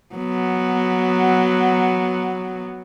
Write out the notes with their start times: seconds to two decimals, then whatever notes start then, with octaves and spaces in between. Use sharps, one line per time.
0.15 F#3 B3